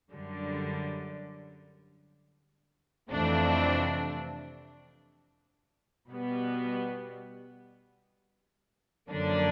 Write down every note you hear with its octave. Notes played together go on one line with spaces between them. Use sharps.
F#2 D3 G3
F2 C3 E3 A3 D4
B2 G3 B3
F#2 D3 F3 A#3 D4